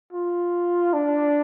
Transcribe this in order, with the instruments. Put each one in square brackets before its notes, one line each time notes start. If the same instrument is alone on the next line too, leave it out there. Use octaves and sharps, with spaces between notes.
[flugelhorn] F4
D4